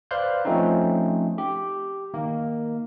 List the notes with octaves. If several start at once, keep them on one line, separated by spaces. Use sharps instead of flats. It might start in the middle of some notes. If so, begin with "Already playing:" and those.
B4 C5 D5 F5 F#6 G6
F3 A3 C4 C#4 D#4
G4
D#3 A#3